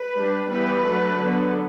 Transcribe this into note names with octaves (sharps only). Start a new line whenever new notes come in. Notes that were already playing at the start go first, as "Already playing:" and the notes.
Already playing: B4
G3 D4
E3 G3 B3 B4
F#3 A3 D4
D3 F#3 B3